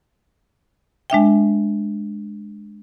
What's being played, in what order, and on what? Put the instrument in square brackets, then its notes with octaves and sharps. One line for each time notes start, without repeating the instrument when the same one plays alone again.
[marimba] G#3 D4 E5 G5